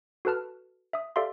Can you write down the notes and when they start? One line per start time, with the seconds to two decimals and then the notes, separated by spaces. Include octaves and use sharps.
0.25 F#4 A4 B4 A5 F6
0.93 E5 D#6
1.16 G4 A4 D5 E5 F5 C6